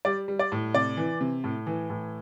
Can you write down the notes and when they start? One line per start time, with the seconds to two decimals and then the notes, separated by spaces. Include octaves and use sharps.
0.05 G3 D5
0.28 G3
0.39 D5
0.52 A2
0.74 C3 D5
0.97 E3
1.21 C3
1.44 A2
1.67 E3
1.90 A2